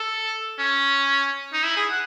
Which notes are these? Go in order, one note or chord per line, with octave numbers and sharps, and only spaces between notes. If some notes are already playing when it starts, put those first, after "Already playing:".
Already playing: A4
C#4
D#4
E4
G#4
F#5